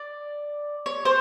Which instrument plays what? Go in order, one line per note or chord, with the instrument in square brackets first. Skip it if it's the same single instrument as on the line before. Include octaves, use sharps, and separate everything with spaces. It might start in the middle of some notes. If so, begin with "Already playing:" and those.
Already playing: [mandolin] D5
C#5
C5